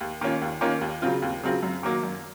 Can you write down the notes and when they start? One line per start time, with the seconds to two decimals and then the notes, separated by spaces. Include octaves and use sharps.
0.01 D#2
0.21 D#3 A#3 C#4 F4
0.42 D#2
0.61 D#3 A#3 C#4 F4
0.81 D#2
1.02 C#3 F#3 C4 F4
1.22 D#2
1.43 C#3 F#3 C4 F4
1.63 F#2
1.83 D#3 F#3 A#3
2.03 F#2